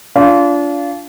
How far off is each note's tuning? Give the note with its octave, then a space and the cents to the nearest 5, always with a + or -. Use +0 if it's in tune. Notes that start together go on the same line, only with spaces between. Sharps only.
D4 -30 F4 -10